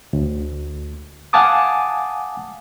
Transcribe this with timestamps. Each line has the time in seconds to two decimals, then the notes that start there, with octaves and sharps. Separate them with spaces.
0.13 D2
1.33 F5 F#5 G#5 A5 D6 D#6